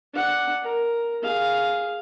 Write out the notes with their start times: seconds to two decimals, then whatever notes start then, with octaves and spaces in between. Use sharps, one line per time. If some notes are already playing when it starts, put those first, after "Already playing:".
0.13 D4 F#5
0.62 A#4
1.22 G#4 F5